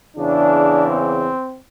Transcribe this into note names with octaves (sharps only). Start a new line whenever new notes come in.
E2 C#3 E3 D4
C4